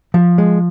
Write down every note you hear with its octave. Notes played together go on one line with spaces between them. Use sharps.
F3
G#3